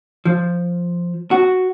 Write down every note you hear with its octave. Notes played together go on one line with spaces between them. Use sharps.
F3
F#4